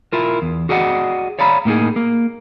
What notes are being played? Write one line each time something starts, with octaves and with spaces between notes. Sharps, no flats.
E4 F4 A#4
E2
F#4 G#4 D5 D#5 F#5
C#5 D5 F5 A#5 B5
A2 A#3 D#4 G#4
A#3